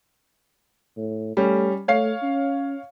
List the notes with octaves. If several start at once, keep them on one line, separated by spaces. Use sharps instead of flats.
A2
G3 A3 C#4
A3 C#5 F5 C7
C#4